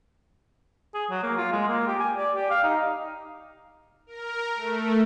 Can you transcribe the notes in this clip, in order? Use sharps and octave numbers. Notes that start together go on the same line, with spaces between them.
G#4
F#3
A#3
F4
G#3
A#3
G4
G#5
D5
G4
F5
D#4
A#4
A3